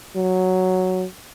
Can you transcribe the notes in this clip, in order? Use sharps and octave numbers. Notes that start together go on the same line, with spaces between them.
F#3